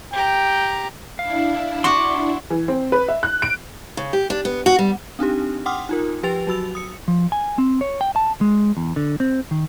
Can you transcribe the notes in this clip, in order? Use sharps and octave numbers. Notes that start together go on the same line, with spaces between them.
G4 G5 A#5
D4 E4 F5
F#4 F#5 C6 D6
E3
C4
B4
E5
F#6
D7
C#3
G4
D4
B3
F#4
G3
C4 D4 D#4 G4
F#5 G5 C6 D6 D#6 F6
D#4 F4 A#4
F3 G4 B4 G5 A6 F7
F#3 F#4 E6 F7
D#6 C#7
F3
G#5
C4
C#5
G5
A5
G#3
E2
D3
C4
D#3